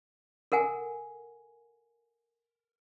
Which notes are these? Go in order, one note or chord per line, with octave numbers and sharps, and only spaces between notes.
A4 A#4 F#5 G#5